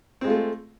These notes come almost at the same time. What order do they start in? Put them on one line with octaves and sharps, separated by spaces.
C4 G#3 F4 A3